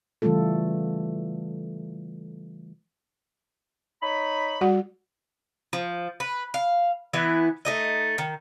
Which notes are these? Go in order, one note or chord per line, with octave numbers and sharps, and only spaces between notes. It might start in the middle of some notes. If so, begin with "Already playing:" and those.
C#3 E3 G3 A3 F4 A4
D#4 C#5 B5
G3 F#4 F#5
F3
B4
F5
E3 B3 E4
A3 D#4 D#5
D#3